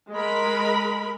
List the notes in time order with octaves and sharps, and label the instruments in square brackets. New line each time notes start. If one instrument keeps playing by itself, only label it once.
[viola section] G#3 A#4 B5